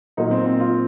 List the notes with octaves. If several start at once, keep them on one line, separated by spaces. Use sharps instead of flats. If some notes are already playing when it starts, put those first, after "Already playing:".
A#2 F#3 A#3 D#4
C4
C4
F4